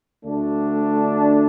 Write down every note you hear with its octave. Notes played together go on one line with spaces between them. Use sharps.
D2 D3 A3 D4